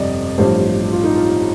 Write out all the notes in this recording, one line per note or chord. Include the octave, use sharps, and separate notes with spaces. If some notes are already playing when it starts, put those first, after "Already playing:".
Already playing: G1 F2 C3 G3 D5 D#5
A1 G2 F3 C5
F4
D#4
F4